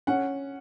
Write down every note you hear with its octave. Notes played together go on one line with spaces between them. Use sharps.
C#4 F#5